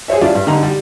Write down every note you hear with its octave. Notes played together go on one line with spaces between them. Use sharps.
G#4 C5 C#5 E5
G3 D4 E4 F4 D5
G2
D3 G3 D#4 A#5 C6
G3